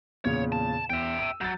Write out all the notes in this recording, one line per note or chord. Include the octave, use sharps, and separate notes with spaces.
E2 A#2 C#3 C#5
A5
E2 E5 G5
E6 D#7
F#3 G6 A6